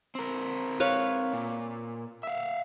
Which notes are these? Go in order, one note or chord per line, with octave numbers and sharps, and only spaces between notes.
C4 A#4
B4 C#5 F5
A#2
E5 F5